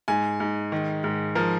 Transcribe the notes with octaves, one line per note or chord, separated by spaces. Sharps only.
G#2 G#5
G#2
D#3
G#2
F3 A#4